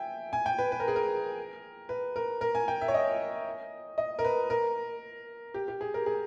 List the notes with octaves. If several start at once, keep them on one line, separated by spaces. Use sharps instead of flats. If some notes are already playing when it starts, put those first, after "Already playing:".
Already playing: E5 G5 G#5
G#5
G5
B4
B4
A#4
G#4
A#4
B4
A#4
A#4
G#5
G5
E5
C#5
D#5
D#5
A#4
B4
A#4
G4
G4
G#4
A#4
G#4